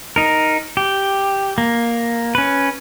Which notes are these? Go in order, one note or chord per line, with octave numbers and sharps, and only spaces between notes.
D#4 A#4
G4
A#3
C#4 B4